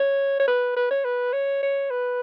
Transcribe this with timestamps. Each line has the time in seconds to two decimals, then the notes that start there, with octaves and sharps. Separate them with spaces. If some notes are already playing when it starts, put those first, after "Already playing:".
Already playing: C#5
0.40 C#5
0.48 B4
0.76 B4
0.91 C#5
1.05 B4
1.33 C#5
1.63 C#5
1.90 B4